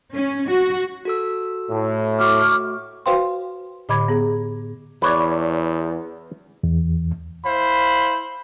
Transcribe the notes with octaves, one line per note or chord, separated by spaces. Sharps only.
C#4
F#4
F#4 A4 E6
A2
A3 F#4 C#6 D6 F6
F#4 B4 C5 F5 G5 C6
A2 D3 D#5 B5 D6 G#6
B3 G#4
E2 B4 C#5 D5
E2
E4 C5 F5 B5